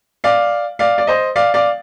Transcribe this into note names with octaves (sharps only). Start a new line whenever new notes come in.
D5 F5
D5 F5
D5
C5 D#5
D5 F5
D5 F5